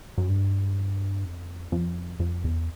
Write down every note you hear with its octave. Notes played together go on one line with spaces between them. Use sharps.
F#2
G2
F2
F2
F2
E2